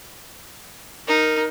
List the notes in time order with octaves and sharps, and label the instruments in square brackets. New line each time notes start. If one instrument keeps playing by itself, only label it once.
[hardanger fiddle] D#4 [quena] A#4